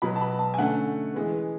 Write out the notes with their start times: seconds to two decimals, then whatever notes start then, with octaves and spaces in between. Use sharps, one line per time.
0.02 B2 F#3 B3 B5
0.16 A5
0.21 B5
0.39 A5
0.54 G#5
0.58 D3 A3 C#4 F#5
1.14 E3 G#3 B3